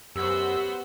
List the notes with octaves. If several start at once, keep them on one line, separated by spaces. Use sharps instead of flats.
F#2 B3 F#4 G4 C5 E6